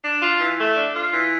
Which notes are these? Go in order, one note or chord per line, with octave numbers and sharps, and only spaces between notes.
D4
F4
E3
A3
D4
F4
E3